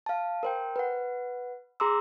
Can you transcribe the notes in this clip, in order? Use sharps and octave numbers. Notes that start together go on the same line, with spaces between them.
F5 A5
A#4 C5 G5
B4 F#5
G#4 A#5 C6 D6 E6